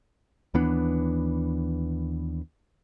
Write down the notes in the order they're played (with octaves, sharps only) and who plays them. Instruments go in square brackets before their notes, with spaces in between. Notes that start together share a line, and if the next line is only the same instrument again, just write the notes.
[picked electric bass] D#2 E3 B3 D4